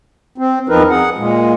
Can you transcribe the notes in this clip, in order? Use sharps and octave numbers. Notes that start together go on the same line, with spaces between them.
C4
E2 F3 C4 D#4 A#4 B4
G#4 F#5
A#2 G#3